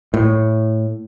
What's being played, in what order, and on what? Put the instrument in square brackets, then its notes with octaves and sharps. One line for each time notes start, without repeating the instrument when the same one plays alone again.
[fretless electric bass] A2